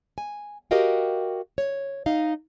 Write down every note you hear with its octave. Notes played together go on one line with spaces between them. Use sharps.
G#5
F#4 G4 A#4 D#5 F5 G5
C#5
D#4 D#5 F5